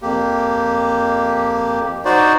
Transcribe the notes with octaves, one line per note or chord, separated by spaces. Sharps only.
F2 A#3 G4
D#4 F#4 C5 D5